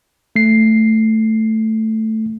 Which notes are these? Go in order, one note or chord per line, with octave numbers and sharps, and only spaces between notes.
A3 C7